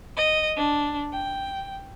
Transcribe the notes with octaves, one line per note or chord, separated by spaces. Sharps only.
D#5
D4
G5